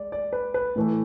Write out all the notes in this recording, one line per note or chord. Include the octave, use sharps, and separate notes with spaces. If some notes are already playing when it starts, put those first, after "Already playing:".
Already playing: G#3 D5
D5
B4
B4
A2 E3 A3